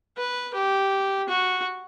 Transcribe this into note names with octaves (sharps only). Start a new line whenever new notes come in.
B4
G4
F#4